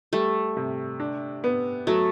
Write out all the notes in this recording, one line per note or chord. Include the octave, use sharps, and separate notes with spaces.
G3 A3
C3
D4
B3
F#3 A3